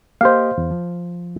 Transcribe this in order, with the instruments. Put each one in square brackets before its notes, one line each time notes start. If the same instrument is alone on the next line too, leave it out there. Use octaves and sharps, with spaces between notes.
[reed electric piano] A#3 G4 D#5 [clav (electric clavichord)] C5 F5
[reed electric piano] E2
F3